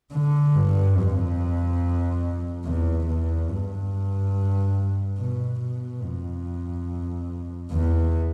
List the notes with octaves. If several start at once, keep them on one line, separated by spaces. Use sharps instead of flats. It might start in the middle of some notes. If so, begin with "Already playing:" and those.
D3
G2
F2
E2
E2
G2
B2
B2
F2
E2